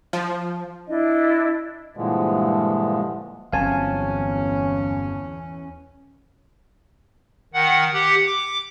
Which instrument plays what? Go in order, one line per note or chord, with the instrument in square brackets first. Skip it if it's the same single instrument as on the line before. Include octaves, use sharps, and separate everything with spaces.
[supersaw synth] F3
[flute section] D4 E4 D#5
[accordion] G2 A#2 D3 E3 F3 G#3
[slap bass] G1 F#3 C4 [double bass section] E2 C#4 [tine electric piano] F5 G#5 A5
[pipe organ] D#3 F#5
G4 F#5
D6